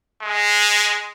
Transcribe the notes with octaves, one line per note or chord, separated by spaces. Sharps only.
G#3